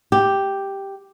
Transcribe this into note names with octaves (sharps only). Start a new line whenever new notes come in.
G4